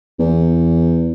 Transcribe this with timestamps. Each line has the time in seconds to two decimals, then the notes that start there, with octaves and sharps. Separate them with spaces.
0.20 E2